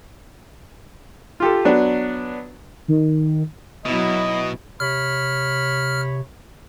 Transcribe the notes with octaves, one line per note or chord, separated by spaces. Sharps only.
F4 G4 A4
F#3 B3 D4
D#3
B2 F#3 B3 E4 D#5
C3 C#5 B5 F6